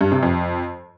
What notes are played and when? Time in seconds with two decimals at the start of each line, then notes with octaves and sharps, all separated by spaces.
0.01 G2
0.12 C3
0.23 F2